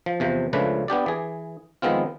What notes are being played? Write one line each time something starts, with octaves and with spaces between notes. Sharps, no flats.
F3
E2 C3 F3
C#2 C#3 F3 A3 D4 B4
B3 D4 G4 D5
E3 G#4
D#3 F3 G#3 B3 C4 F4